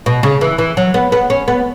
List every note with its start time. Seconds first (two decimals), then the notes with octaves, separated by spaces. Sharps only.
0.06 B2
0.23 C#3
0.41 E3
0.58 E3
0.77 F#3
0.94 B3
1.12 B3
1.30 C#4
1.48 B3